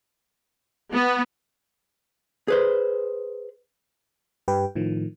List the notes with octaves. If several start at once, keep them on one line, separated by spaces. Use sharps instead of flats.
B3
G#4 B4 C5
G2 G4 B4 G5
A2 D#3 F3